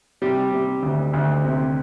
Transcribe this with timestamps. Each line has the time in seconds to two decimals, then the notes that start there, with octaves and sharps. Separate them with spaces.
0.22 C3 G3 G4
0.53 C3
0.83 D2
1.13 D2
1.44 C3